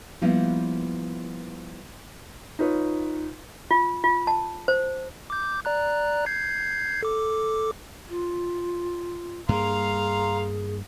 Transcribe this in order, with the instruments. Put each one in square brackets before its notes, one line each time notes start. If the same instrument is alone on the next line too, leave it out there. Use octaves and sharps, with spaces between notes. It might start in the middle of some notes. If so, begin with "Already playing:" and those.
[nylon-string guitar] F3 G3 A#3 B3 E4 B4
[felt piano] D#4 F4 B4 C#5
[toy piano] F4
F4
A5
C5
[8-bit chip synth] D6 G6
D5 A#5 F#6
G6 G#6 C7
A4 D6
[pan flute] F4
[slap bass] G2 A#3 [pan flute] G#4 [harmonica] F5 A#5 C6